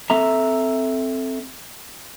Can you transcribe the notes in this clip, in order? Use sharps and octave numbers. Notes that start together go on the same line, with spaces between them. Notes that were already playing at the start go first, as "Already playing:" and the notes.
C4 A4 E5 A#5